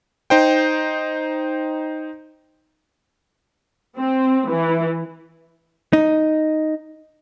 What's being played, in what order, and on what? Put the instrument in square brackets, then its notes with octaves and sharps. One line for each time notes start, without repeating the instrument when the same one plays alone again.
[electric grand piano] D#4 C5 G5
[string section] C4
E3
[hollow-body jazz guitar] D#4